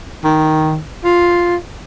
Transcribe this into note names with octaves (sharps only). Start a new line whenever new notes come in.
D#3
F4